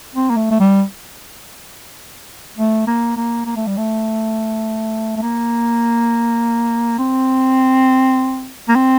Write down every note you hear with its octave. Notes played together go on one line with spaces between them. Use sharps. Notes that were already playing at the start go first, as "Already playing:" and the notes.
C4
A#3
A3
A3
G3
A3
A#3
A#3
A#3
A3
G3
A3
A3
A#3
C4
A#3
C4